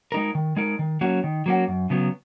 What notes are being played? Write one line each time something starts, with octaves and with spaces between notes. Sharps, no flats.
G#3 D#4 A#4
D#3
G#3 D#4 A#4
D#3
F#3 A#3 C#4 F#4
D#3
F#3 A#3 C#4 F#4
F#2
C#3 F#3 B3